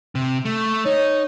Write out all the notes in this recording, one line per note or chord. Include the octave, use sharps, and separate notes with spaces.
C3
A3
D#4 C#5